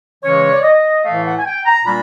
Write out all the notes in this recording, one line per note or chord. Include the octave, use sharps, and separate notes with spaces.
C#3 E3 G#3 C#4 C#5
D5
D#5
A2 E3 A3 F5
F#5
G#5
G5
A#5
A#2 G3 A#3 D4 B5